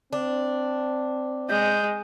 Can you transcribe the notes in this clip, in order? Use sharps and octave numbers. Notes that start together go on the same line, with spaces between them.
C4 D4
G#3 G6